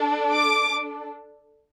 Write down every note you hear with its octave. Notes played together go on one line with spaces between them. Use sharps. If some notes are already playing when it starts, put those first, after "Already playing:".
Already playing: D4 A4
D6